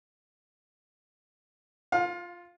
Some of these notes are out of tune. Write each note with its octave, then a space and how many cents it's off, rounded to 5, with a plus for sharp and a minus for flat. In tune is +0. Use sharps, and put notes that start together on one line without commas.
F4 +0 F5 +30